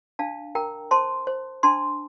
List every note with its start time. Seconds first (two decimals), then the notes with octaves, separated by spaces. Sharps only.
0.19 D4 F5 A5
0.55 A#4 G5 A#5
0.91 C5 A5 C6
1.27 C5
1.63 D4 A5 C6